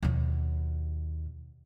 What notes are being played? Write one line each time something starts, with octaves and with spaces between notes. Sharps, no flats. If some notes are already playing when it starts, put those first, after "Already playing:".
D#2 B2